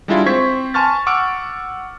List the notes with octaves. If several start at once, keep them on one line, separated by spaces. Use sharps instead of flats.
G3 G#3 D4 E4 F4
C4 C5 C#6 G#6 B6
G#5 A5 C6 C#6 F6 A6
F#5 C#6 D6 E6 F6 D7